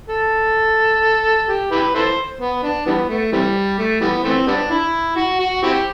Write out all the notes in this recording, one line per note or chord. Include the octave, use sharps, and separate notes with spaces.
A4
G4
E4 G4 B4
E4 A4 C5
B3
D4
E3 G3 B3
A3
C3 E3 G3
A3
E3 G3 B3
E3 A3 C4
G3 B3 D4
E4
F#4
F#4
C4 E4 G4